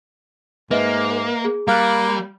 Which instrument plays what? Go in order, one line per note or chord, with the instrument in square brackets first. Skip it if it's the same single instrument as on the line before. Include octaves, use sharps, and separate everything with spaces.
[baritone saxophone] G#2 [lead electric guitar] A#3 [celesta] B4 D#5 E5
[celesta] G#4
[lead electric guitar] G3 [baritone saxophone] A#3 [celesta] F5 F6 F#6